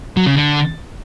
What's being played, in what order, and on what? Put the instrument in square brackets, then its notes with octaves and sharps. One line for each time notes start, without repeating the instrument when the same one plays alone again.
[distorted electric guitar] F#3
C#3
D3